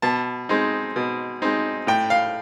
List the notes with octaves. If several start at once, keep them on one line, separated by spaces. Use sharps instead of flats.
B2 A5
G#3 C4 D#4
B2
G#3 C4 D#4
A2 G5
F5